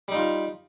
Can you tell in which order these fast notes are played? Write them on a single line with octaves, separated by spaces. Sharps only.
G3 D#4 F4